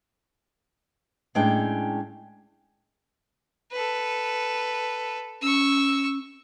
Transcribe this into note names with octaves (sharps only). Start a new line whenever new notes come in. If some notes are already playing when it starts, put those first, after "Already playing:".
A2 G#3 C#4 D4 G5
A4 B4
C#4 C#6 E6